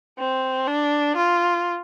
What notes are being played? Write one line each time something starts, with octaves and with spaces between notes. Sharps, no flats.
C4
D4
F4